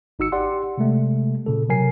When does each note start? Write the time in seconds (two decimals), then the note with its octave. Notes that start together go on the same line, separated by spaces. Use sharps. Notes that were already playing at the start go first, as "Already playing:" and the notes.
0.19 G#1 D#4 F#4 E6 C#7
0.32 G4 D5 F#5 C6
0.78 C3 G#3 A3
1.46 A#2 C#3 A4
1.69 C3 F#3 A#4 G#5 C7